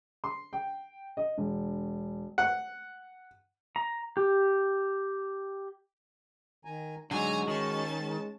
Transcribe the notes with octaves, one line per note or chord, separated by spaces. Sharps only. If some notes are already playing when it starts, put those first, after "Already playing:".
C6
G5
D#5
E1
F#5
A#5
G4
D#3 G#5 A#5
D3 F#3 G#3 D#4 F#4 G#5 A#5
D#3 C#4 A5
G#3